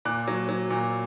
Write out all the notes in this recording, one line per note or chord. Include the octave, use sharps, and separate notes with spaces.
A#2 D6 F#6
F#3
F#3
A#2